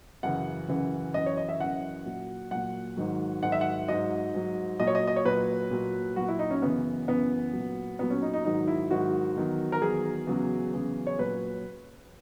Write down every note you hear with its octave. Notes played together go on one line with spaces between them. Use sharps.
F#2 C#3 E3 F#5
F#2 C#3 E3
F#2 E3 D#5
C#5
D#5
E5
F#2 E3 F#5
A#2 F#3
A#2 F#3 F#5
G#2 D#3 F#3
G#2 D#3 F#3 F#5
E5
F#5
G#2 F#3 D#5
G#2 F#3
A#2 F#3 D#5
C#5
D#5
D#5
C#5
A#2 F#3 B4
A#2 F#3
A#2 F#3 F#4
E4
D#4
C#4
F#2 C#3 E3 B3
F#2 C#3 E3 B3
A#2 F#3
A#2 F#3 B3
C#4
D#4
D#4
G#2 D#3 F#3 D#4
E4
G#2 D#3 F#3 F#4
E2 D#3 F#3
A#4
E2 D#3 F#3 G#4
E2 C#3 F#3
E2 C#3 F#3
C#5
A#2 F#3 B4